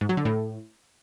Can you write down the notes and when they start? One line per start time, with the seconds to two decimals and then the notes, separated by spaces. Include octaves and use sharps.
0.01 G#2
0.09 F#3
0.17 D3
0.25 A2